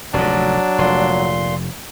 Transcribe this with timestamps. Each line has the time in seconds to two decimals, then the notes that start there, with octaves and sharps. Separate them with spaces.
0.14 F1 D2 G#2 F#3 D4
0.78 F1 A#2 C6